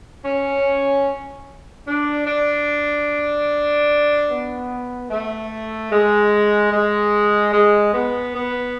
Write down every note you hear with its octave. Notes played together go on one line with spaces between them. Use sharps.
C#4
D4
D4
B3
A3
G#3
G#3
G#3
B3
B3